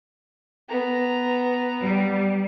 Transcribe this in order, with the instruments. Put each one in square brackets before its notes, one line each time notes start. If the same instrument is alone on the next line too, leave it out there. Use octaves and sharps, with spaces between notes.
[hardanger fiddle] B3 A#5
[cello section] G3